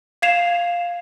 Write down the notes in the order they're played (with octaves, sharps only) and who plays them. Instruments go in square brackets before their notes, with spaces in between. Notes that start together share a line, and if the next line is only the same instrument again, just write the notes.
[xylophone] F5 G#6 C7 E7 F7